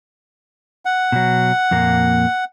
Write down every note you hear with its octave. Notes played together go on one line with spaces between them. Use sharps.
F#5
B2 F#3
F2 A#2 A#3